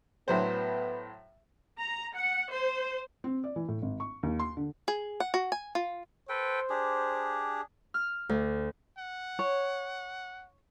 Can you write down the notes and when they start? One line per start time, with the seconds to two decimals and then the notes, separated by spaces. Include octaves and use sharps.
0.28 A2 F#3 B3 C5
1.78 A#5
2.15 F#5
2.50 C5
3.24 C4
3.44 D5
3.56 E3
3.69 A2
3.82 G#1
4.00 C#6
4.23 D#2
4.39 C6
4.57 D3
4.88 G#4
5.20 F#5
5.34 F#4
5.52 G#5
5.75 F4
6.29 A4 B4 C5 G5
6.70 D4 G4 G#4
7.94 F6
8.29 D2
8.98 F#5
9.39 C#5